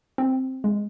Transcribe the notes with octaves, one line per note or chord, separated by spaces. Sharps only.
C4
G#3